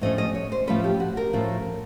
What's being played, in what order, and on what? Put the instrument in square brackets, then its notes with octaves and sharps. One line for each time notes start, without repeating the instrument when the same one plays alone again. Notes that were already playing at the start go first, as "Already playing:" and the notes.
[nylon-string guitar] A2 F3 A3 C#4 D#5
D#5
C#5
C5
A2 F3 A3 C#4 B4
G4
F#4
A#4
A2 F3 A3 C#4